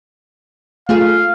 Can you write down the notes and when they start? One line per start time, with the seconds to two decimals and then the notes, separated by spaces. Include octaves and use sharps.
0.89 A3 F4 G#4 F5